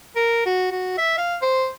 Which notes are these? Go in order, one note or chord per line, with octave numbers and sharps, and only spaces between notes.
A#4
F#4
F#4
E5
F5
C5